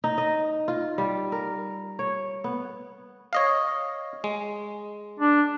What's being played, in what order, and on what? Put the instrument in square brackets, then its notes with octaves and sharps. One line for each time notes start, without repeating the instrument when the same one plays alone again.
[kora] D#4
D#5
F4
G3
A#4
C#5
B3
[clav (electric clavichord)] C#5 D#5 F5
G#3
[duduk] D4